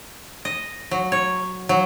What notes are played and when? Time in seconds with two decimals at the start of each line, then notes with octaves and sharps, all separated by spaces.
0.45 D#5
0.91 F#3
1.12 C#5
1.69 F#3